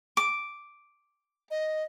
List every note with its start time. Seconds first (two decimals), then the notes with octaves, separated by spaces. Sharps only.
0.17 D6
1.51 D#5